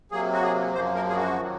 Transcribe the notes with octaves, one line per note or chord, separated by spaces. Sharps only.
C3 F#3 A#3 G#4
F#4
G#4
F#2 F3 A#3 C5
A#4
G#4
F#4
D#3 F#3